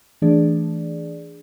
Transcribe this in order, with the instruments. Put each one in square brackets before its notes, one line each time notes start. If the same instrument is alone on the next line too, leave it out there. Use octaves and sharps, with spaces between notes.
[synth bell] E3 A3 D4 G#4 D5